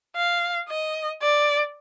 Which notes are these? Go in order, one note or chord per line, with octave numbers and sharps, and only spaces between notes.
F5
D#5
D5